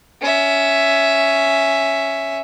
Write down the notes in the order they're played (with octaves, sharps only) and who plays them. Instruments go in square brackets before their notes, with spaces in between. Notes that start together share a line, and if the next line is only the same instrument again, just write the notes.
[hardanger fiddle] C#4 E5